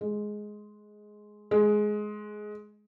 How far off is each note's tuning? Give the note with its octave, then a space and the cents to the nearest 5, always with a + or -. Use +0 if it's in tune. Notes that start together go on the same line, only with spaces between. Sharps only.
G#3 +10
G#3 +15